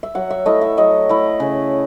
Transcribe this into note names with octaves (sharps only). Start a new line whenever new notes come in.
E5
F#3 F#5
E5
A3 E4 D#5
E5
F#3 D#5
A3 E4
C#3